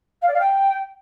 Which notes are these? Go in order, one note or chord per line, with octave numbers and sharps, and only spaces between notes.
F5
D5
F5
G5